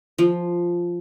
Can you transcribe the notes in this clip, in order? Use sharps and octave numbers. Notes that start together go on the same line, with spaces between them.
F3